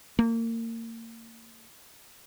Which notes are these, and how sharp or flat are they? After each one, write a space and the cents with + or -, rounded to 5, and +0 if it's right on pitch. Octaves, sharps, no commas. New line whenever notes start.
A#3 -35